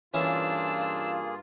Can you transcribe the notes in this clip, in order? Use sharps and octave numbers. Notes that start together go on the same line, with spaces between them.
G2 E3 A#3 C#4 D4 F4 G#4 E6